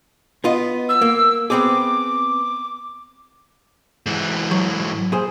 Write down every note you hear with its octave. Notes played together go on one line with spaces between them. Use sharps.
B3 F4 D#5
E6
A#3
B3 C4 G#4 D6
G#2 E3
F#3
A#2 G#4 C5